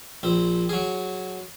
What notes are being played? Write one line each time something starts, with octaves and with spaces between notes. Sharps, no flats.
A#1 C4
F#3 G#4